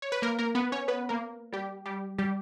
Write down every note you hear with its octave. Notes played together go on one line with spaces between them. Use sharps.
C#5
B4
A#3 A#4
A#3 A#4
B3 B4
C#4 C#5
B3 B4
A#3 A#4
G3 G4
G3 G4
G3 G4